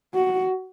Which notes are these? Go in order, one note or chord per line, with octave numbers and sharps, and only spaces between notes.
F#4